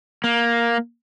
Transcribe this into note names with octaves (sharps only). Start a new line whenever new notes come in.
A#3